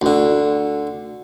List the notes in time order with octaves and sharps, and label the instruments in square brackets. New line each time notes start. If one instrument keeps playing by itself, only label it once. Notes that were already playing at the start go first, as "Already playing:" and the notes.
[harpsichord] D2 D3